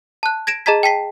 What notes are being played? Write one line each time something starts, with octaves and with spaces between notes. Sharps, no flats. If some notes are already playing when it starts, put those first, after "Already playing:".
A5 F#6
G#6 A#6 D7 E7
G#4 D#5 A5 A#5 G#6 B6
G5 A5 B6 C7